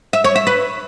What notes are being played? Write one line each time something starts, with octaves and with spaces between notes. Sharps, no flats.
E5
C#5
E5
B4